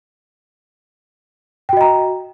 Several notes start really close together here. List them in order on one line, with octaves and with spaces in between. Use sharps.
G5 F#4 D#5 A#5